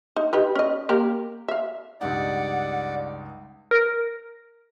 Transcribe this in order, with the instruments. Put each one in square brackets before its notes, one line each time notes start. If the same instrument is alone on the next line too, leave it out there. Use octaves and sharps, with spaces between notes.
[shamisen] D#4
D#4 G4 B4
C#4 D#5
A#3 G4 A#4
E5 F5
[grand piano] C#2 G2 D#4 [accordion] D5 [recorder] F#5
[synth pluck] A#4